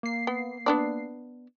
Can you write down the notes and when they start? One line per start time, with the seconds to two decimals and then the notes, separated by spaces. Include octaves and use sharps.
0.03 A#3 C7
0.27 B3
0.66 B3 D4 D5